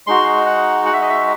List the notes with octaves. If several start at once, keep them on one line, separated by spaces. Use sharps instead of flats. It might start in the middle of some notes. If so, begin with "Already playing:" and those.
G#3 D#4 F#4 C6
F#5
F#5
E5
D#5
E5